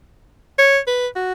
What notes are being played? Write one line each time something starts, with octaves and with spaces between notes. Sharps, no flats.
C#5
B4
F#4